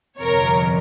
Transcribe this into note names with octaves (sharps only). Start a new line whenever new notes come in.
G1 F2 C3 A#4 C#5